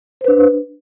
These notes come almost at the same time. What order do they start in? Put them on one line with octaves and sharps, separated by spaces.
C5 B4 D4